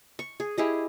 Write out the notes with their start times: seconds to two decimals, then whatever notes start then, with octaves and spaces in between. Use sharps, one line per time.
0.19 C#6
0.40 G#4
0.58 E4 G4 G#4 D#5